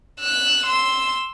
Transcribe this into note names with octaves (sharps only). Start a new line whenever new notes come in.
E6 F#6
C6 E6